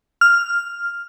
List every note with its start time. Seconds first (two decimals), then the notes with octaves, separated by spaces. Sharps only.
0.21 F6